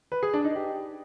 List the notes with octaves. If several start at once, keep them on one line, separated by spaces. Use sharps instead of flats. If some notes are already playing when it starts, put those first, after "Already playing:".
B4
G#4
D4
D#4
G4